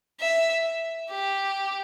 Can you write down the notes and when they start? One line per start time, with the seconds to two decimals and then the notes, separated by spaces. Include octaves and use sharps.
0.20 E5
1.11 G4